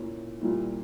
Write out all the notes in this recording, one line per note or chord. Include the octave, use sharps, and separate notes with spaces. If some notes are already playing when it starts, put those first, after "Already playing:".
Already playing: A#2 A#3 C#4 E4
A#2 G3 A#3 E4